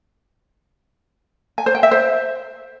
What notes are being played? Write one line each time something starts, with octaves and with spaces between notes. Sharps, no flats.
G#5
C5
G5
E5
C5